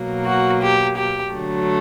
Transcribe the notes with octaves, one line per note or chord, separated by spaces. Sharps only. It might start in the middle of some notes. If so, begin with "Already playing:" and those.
Already playing: B2 F#3 A#3
F#4
G4
G4
D3 F#3 A3